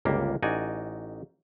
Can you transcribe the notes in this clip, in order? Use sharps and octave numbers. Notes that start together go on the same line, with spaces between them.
G1 C#2 A#3 G4
A1 D#4 F#4 D5 G#5